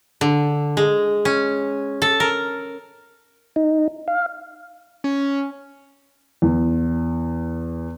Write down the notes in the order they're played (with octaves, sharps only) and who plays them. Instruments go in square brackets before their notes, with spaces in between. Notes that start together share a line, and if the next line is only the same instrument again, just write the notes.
[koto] D3
G#3
C#4
A4
A#4
[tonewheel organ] D#4
F5
[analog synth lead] C#4
[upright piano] E2